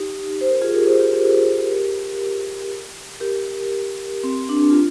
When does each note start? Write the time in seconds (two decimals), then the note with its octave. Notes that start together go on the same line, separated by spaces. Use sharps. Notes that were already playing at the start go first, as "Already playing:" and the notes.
Already playing: D#4 G4
0.41 C5
0.51 A#4
0.61 F4 G#4
0.75 G4 A#4
0.87 G#4 C5
1.00 G4 A#4
1.13 G4 A#4
3.20 G4 A#4
4.24 C4
4.49 D4
4.70 F4